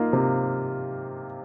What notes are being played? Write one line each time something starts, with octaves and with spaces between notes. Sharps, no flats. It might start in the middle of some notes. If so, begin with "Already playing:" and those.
Already playing: A#3 D#4 F4
C3